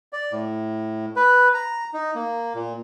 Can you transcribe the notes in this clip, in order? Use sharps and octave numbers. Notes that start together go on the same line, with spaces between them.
D5
A2
B4
A#5
D#4
A#3
A#2